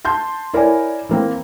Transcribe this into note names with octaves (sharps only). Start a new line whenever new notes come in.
A5 C6 G6
E4 A#4 C#5 D5 G#5
E3 A#3 C4